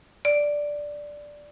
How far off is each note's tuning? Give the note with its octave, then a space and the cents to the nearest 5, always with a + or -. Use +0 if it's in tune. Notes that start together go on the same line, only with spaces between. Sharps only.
D5 +0